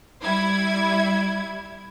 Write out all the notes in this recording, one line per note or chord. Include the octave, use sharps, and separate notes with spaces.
G3 E4 G#6